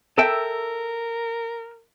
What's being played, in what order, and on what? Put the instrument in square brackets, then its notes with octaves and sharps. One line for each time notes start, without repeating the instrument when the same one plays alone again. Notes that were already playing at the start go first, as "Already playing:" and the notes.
[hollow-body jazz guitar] A4 E5 G5 [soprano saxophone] A#4